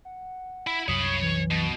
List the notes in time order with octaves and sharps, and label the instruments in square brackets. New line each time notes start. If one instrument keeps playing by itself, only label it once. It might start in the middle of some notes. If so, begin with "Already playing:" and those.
[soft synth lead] F#5
[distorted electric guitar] E4
[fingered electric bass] C2 F#2 F#3 [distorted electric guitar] C#5 B5 [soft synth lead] D#6
[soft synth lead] E3
[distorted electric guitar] B2